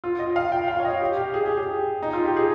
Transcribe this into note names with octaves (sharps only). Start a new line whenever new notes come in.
F4
D#5
F5
G5
F5
C#5
D#5
G4
G4
G#4
G4
G#4
D#4
F4
G4
G#4